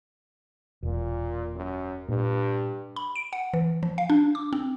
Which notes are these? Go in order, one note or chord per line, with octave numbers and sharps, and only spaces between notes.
E1 A#2
F#2
G2 A#2
B5
D7
F#5
E3
F3
F5
D4
D6
C4